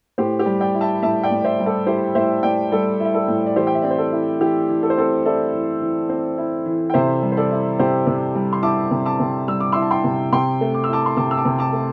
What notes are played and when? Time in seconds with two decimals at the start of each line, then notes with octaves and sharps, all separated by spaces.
0.18 A2 G4 C5
0.39 G4
0.46 G3
0.60 D5 G5
0.75 E4
0.81 E5 A5
1.02 A2 E5 A5
1.24 D5 G5
1.30 A2
1.41 D5
1.44 C5 E5
1.60 G3
1.66 A4 D5
1.87 E4 G4 C5
2.15 A2 C5 E5
2.43 A2 D5 G5
2.71 G3 A4 D5
3.00 E4 E5
3.14 A4 D5
3.28 A2
3.46 D5
3.56 E3 G4 C5
3.67 G5
3.75 E5
3.82 C4 D5
3.91 C5
3.98 A4
4.12 E4
4.40 E3 G4
4.69 E3
4.83 A4
4.90 C5
4.98 C4 A4
5.25 E4 A4 D5
5.54 E3
5.82 E3
6.09 C4
6.38 E4
6.66 E3
6.90 G5
6.94 C3 C5 E5
7.22 G3
7.32 C5
7.37 A4 D5
7.51 E4
7.79 C3 G4 C5
8.07 C3
8.35 G3
8.53 C6
8.63 E4 A5 D6
8.91 C3
9.05 A5 D6
9.19 C3
9.48 G3 E6
9.60 D6
9.72 E4 C6 E6
9.82 A5
9.91 G5 C6
10.04 C3
10.32 C3 G5 C6
10.61 A3
10.74 D6
10.84 E6
10.89 E4 A5 D6
11.06 C6
11.17 C3 A5 D6
11.31 E6
11.37 A5 D6
11.45 C3
11.59 A5 D6
11.73 A3